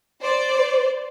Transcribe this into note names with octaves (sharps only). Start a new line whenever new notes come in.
C5 D5